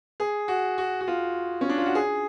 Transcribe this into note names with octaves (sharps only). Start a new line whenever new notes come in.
G#4
F#4
F#4
F#4
F4
C#4
D4
F4
F#4
G#4